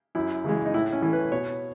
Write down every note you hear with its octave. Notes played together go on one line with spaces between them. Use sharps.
F#2 E4
C#3 E3 G#3
D#4
A2 E4
C#4
E3 A3
B4
B2 C#5